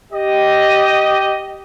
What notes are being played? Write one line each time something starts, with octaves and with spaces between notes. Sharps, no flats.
G4 D#5